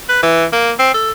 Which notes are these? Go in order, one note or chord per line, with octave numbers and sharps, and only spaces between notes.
B4
E3
A#3
C4
A4